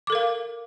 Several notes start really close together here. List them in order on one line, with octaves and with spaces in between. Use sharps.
D6 A4 A#4 F5